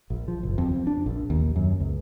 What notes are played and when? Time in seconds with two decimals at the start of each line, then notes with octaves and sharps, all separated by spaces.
0.10 A#1
0.28 F3
0.43 F#1
0.58 F2
0.72 F2
0.87 D4
1.06 A#1
1.30 D#2
1.56 F#2
1.80 C#2